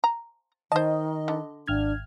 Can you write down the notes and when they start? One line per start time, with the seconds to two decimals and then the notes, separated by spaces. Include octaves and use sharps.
0.04 A#5
0.72 D#3 C5 D#5 A5
1.28 D3
1.68 G#1 D4 F6 G#6